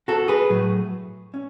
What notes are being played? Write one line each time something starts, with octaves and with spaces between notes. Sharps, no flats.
F#4 A4
G#4 B4
A2 F#3 A3
C#4